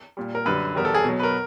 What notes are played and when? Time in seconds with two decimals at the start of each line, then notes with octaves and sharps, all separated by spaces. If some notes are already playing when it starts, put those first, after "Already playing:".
0.17 A#2 G3
0.35 A#4
0.46 F#2 D3 G3 B4
0.75 E2 B2 G3 A#4
0.85 A4
0.94 G#4
1.04 B2 F#3
1.19 B4
1.23 A#4